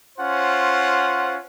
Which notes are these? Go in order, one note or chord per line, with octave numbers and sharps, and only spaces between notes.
C#4 F4 C5 F#5